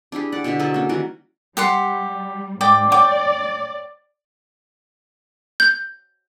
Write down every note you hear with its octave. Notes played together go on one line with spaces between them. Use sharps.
D4 E4 G4 G#4
D5 F#5
B2 D3 F#4 E5
F#3 G#4 A4 E5
A#3 C#4
D#3 E3 G3 F#4
G3 G4 F#5 C6
G#2 D5 G5 D6
C#5 D5 G5 D6
G6